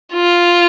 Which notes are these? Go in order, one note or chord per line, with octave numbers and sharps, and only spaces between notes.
F4